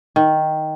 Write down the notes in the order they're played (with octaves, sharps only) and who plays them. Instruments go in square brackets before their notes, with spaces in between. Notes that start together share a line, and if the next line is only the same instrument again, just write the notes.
[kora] D#3